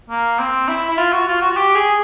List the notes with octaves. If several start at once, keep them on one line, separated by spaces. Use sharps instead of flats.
A#3
C4
E4
E4
F4
F#4
F4
F#4
F#4
G4
G#4